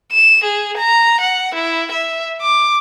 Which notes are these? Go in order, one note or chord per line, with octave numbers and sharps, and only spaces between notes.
E7
G#4
A#5
F#5
E4
E5
D6